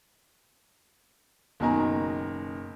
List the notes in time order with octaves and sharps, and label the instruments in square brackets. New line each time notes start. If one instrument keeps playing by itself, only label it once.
[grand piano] F#1 B2 D#3 D#5 G#5 A#5